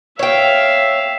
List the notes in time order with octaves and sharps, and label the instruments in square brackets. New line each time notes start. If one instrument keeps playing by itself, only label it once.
[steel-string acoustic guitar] C#5 G5 [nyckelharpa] E5 F5